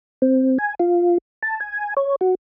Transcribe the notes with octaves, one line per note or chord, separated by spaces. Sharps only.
C4
G#5
F4
A5
G#5
C#5
F#4